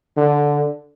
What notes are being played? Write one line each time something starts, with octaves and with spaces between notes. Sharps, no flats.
D3